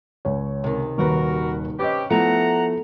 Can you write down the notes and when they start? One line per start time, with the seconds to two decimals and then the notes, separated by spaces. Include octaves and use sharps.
0.25 C#2 C#5
0.64 C3 D#3
0.98 D#1 D#2 F#4 A#4 B4
1.79 C3 C#4 G4 B4 D#5
2.10 F3 A3 B3 E4 F#5 A#5